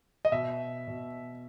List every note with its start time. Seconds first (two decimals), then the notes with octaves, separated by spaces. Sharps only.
0.25 D#5
0.32 B2 E5
0.88 B2